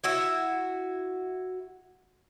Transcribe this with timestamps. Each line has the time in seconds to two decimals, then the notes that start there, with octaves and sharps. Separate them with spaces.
0.04 E4 F#4 E5